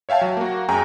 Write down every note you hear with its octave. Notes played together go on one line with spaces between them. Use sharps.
C#5 E5 F5 G5 A5
F#3
A#3 F#4
F#2 G#4 G5 G#5 A#5